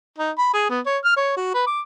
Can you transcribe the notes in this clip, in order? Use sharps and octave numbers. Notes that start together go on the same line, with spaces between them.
D#4
B5
G#4
B3
C#5
F6
C#5
F#4
B4
D6